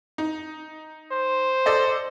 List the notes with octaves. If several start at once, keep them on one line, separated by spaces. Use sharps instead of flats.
D#4
C5
A4 D5 D#5